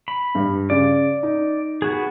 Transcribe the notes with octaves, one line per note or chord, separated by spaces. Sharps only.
B5
G2
C#3 D5
D#4
B3 F#4 G#4